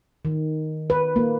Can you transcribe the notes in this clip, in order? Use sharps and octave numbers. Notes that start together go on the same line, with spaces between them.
D#3
B4
A#3